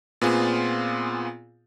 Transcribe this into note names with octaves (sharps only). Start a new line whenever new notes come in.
A#2 B3 C4 F4 G#4